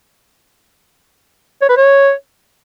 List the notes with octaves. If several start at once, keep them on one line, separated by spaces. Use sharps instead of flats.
C#5
B4
C#5